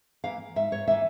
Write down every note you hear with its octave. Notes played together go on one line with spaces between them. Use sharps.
E3 A#3 F5
G#2 E5
C#5
E3 A#3 E5